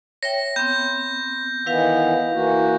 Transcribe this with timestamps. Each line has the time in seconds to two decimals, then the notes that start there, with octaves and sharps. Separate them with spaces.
0.23 C#5 E5 G5 A#6
0.56 B3 C4 G6
1.66 D#3 E3 B3 E4 B4 F5
2.33 E3 A#3 F#4